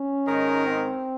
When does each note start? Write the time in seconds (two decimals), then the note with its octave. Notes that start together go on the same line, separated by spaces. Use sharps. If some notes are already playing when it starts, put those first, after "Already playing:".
Already playing: C#4
0.27 G#2 D#3 G#3 D#4 A#4
0.66 C4